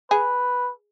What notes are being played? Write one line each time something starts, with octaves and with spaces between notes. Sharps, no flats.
G#4 B4